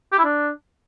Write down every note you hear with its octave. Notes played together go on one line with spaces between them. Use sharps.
G4
E4
D4